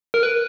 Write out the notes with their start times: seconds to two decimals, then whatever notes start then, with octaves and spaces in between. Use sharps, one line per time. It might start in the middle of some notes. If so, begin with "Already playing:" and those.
0.14 A#4
0.23 B4